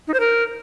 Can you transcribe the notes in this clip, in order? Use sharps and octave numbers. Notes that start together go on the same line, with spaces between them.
D#4
C5
A#4